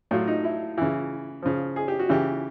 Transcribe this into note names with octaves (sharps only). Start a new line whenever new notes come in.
A2 F#3 F4
D#4
E4
C#3 E3
C#3 F3
G#4
G4
F#4
C#3 E3 G4